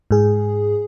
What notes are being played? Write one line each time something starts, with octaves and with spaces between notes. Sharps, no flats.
G#2 G#4